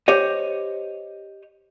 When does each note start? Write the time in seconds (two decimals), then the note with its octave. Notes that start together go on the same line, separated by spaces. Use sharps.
0.08 G4 C5 C#5 D#5